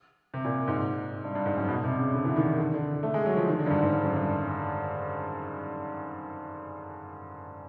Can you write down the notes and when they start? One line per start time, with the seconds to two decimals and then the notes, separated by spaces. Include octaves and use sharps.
0.34 C3
0.45 A#2
0.68 G#2
1.24 G2
1.35 G2
1.46 G#2
1.57 F#2
1.69 B2
1.84 C3
1.99 C#3
2.14 D3
2.25 E3
2.36 D#3
2.58 D3
2.74 D3
3.03 A3
3.14 G#3
3.26 F#3
3.37 F3
3.48 D#3
3.59 D3
3.66 G2
3.71 G#2
3.82 G#2
3.93 G2
4.05 F#2
4.16 G2